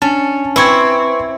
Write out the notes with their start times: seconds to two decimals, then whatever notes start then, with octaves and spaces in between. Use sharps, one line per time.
0.02 C#4 D4 A5
0.56 C4 E4 B4 C#6 G#6